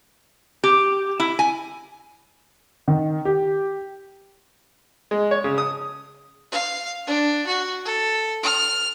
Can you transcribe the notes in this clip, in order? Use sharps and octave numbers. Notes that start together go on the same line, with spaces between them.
G4
E4
G#5
D#3
G4
G#3
C#5
C#3
D#6
F5
D4
F#4
A4
F6